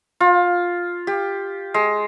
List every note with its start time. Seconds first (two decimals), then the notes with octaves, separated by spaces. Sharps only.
0.20 F4
1.07 G4
1.74 G#3